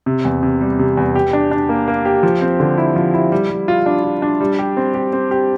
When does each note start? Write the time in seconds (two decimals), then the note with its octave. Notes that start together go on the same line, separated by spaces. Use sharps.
0.06 C3
0.25 E2
0.43 C3
0.61 G3
0.79 C3
0.97 E2
1.15 G4
1.33 D4
1.51 D4
1.69 A#3
1.88 A#3
2.05 G4
2.23 F3
2.42 C4
2.60 D3
2.78 E4
2.96 F3
3.14 E4
3.32 G3
3.50 G3
3.68 F4
3.86 D4
4.04 F4
4.22 D4
4.41 G3
4.59 G4
4.77 C4
4.94 G4
5.13 C4
5.31 G4